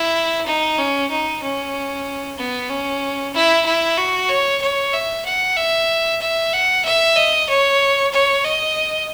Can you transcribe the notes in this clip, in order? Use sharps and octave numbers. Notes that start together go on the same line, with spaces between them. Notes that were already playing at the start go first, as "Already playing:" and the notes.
Already playing: E4
D#4
C#4
D#4
C#4
B3
C#4
E4
E4
F#4
C#5
C#5
E5
F#5
E5
E5
F#5
E5
D#5
C#5
C#5
D#5